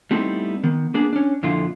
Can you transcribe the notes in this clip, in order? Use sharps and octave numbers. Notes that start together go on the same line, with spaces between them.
G3 A3 B3 C4 D#4 E4
D#3 B3
A#3 B3 D4 G#4
C#4 D4
F2 A#2 D3 E4 F4